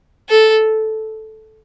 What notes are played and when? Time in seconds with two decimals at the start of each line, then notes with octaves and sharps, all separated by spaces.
0.29 A4